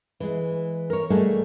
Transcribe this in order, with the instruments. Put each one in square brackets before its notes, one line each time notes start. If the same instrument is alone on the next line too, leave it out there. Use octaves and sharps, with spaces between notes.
[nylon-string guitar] E3 G#3
A#4 C#5
G3 A3 A#3 D#4 F#4 G#4